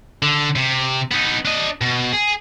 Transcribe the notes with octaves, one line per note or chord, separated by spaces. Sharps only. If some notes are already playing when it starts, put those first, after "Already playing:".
D3
C3
B3 D#4
D4 D#5
B2
G#4